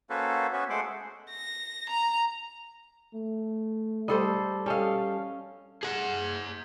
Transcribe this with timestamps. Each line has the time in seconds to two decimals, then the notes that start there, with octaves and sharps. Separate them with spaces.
0.10 A#3 C#4 F#4 A4 B4 C5
0.53 B3 C#4 F#4 B4 E5
0.70 G#3 A3 C5 F#5 C6 D6
1.30 A#6
1.89 A#5
3.14 A3
4.08 G3 A4 C5 D#5
4.66 G3 C#4 A4 D#5 F5
5.83 G#4 F#5